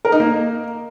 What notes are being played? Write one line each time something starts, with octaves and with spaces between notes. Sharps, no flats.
A#4
D#4
A#3